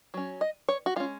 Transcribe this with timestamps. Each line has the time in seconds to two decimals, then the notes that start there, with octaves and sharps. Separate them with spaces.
0.14 F#3 C#4
0.41 D#5
0.69 C#5
0.86 F#4
0.96 G#3 F4
1.00 C#4